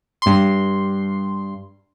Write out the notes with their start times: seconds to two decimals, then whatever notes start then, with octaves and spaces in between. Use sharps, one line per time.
0.22 G2 C6